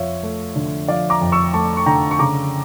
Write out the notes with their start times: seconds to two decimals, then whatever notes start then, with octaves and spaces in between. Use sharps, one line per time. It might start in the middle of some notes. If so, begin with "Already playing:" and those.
Already playing: F2 F3 C#5 E5 F5
0.23 A3
0.56 D3
0.88 F3 D5 F5
1.10 A#5 D6
1.21 F2
1.32 C#6 E6
1.54 A3 A5 C#6
1.77 C#6
1.86 D3 G5 A#5
2.11 C#6
2.19 C#3 A#5 D6